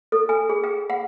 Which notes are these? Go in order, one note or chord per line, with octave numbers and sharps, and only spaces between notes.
A4
G#5
G#4
G5
F#5